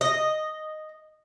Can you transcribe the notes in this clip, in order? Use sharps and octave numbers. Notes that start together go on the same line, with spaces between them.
D#5